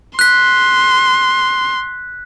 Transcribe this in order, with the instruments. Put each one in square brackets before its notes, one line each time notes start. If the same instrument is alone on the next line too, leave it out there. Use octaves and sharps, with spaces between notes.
[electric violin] C6 [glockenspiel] F#6 B6